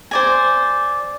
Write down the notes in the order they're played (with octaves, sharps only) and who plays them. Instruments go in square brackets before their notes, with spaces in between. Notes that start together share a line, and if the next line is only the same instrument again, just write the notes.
[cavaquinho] C5 D5 G#5